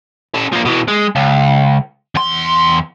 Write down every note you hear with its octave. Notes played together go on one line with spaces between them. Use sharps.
C#4 A4
F3 A#3
B2 E3
G#3
C#2
E2 C6